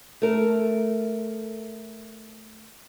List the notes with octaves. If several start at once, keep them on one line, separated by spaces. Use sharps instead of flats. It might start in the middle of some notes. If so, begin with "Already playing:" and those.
A3 A#4